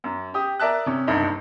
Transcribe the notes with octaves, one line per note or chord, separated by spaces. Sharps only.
F#2
G4 D#6
A#4 D5 E5 A5 F#6
C3 C#4
F#1 C2 G2 D#4